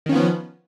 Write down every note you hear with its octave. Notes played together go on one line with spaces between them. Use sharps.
D#3 F3 B3 C#4